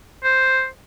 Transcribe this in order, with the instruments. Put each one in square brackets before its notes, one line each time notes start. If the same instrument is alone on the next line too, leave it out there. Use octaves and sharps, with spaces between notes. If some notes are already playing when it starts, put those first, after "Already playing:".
[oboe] C5